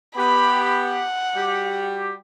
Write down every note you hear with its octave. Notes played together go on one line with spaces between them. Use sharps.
B3 G4 B5
F#5
G3 F#4 G4